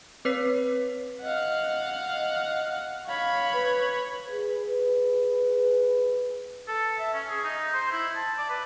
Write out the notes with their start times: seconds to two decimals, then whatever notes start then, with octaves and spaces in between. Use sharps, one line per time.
0.25 C4 B4 C#5 B6 C7
1.22 D#5 F5 F#5
2.13 D#5
3.07 C#5 F5 B5
3.54 B4
4.28 G#4 B4
6.68 A4
6.99 E5
7.13 C#4
7.28 G#4
7.44 D#4
7.73 C5
7.91 E4
8.15 A5
8.37 D5
8.49 B4